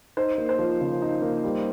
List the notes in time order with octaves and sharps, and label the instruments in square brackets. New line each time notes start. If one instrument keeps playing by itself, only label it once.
[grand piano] D#4 [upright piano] C5
[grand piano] A#3
[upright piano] C5
[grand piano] F3
C#3
D#4
A#3
G3